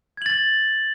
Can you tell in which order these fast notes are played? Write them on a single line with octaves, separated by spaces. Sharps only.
G#6 F#7 A6